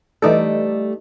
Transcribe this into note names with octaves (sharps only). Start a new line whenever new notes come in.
E3 G3 A3 D#4 A4 D5